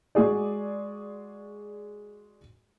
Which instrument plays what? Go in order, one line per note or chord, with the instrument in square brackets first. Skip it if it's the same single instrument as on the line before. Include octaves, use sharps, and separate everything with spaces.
[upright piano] G#3 F#4 G#4 D5